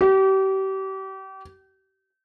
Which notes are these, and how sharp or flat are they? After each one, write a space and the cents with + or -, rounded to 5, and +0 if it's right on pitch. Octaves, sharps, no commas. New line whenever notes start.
G4 -35